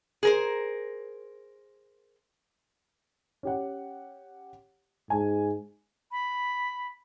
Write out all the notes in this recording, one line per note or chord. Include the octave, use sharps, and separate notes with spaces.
G#4 A#4 C5
C#4 G4 F#5
G#2 G#5
B5